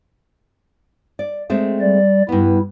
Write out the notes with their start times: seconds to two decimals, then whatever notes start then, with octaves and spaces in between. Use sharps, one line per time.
1.19 D5
1.50 G#3 A3 C4
1.80 G3 D5
2.29 G2 B3 E4